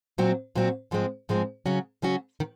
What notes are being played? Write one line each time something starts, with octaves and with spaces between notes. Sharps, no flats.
A#2 F#3 C4 F#4
A#2 F#3 C4 F#4
G#2 F3 G#3 C4
G#2 F3 G#3 C4
C#3 F#3 C#4 F#4
C#3 F#3 C#4 F#4
D#3